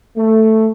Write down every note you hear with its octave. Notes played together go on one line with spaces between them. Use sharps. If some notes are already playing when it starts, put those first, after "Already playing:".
A3